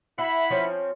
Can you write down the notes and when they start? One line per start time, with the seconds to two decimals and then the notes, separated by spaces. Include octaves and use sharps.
0.19 E4 E5 F#5 B5
0.51 F3 C4 C#4